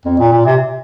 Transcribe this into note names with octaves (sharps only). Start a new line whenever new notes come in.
F2
A#2
A#2
C3